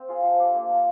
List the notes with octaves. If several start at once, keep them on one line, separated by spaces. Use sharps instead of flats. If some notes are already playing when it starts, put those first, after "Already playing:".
Already playing: C4
F4 G#4 C5
F3
A3 D4 G4
A#3
D4 F4